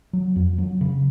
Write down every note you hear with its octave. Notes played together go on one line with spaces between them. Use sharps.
F#3
F2
F#3
C#3